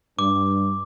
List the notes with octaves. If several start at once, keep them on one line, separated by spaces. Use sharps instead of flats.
G2 D6